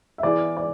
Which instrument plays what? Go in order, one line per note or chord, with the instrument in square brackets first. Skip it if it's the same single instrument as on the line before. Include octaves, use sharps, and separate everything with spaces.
[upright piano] E5
[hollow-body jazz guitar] E3 B3 E4 G#4 [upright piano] D5
[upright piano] D5